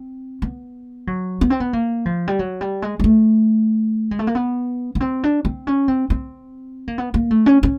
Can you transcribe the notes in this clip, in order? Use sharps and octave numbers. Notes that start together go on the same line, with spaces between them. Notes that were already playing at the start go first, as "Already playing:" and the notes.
Already playing: C4
B3
F#3
B3
C4
B3
A#3
F3
G3
F#3
G3
G#3
G#3
A3
G#3
A3
A#3
B3
B3
C4
D4
C4
C#4
C4
C4
A#3
B3
A#3
A3
C#4
C#4